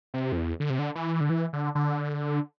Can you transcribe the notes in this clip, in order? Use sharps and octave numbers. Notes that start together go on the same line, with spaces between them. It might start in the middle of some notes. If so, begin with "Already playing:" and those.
C3
F2
E2
D3
C3
D3
E3
D3
E3
D3
D3